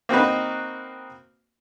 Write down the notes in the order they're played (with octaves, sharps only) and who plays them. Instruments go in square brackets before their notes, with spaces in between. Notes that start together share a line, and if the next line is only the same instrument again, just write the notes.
[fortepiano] A#3 C4 D#4 F#4 B4